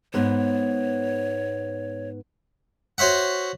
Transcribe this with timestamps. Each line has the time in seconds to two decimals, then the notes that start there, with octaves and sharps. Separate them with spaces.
0.14 G#2 B3 C#5
2.98 F#4 C5 C#5 E5 F#5